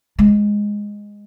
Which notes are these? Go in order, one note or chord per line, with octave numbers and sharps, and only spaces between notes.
G#3